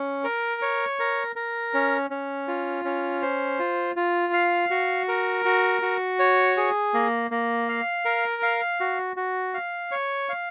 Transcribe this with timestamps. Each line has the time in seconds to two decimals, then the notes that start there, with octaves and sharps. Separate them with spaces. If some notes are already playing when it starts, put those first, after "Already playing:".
Already playing: C#4
0.24 A#4
0.62 C#5
0.99 A#4
1.36 A#4
1.74 C#4
2.11 C#4
2.48 F4
2.85 C#4
3.22 C5
3.59 F4
3.96 F4
4.33 F5
4.70 F#4
5.08 A#4
5.45 F#4
5.82 F#4
6.19 C#5
6.57 G#4
6.94 A#3
7.31 A#3
7.69 F5
8.05 A#4
8.43 F5
8.80 F#4
9.16 F#4
9.54 F5
9.91 C#5
10.29 F5